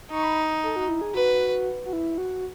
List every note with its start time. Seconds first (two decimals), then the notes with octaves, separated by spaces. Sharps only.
0.11 D#4 C#6
0.24 B5
0.63 A4
0.76 F#4
0.89 E4
1.01 G#4
1.14 F#4 B4
1.85 F#4
1.93 E4
2.18 F#4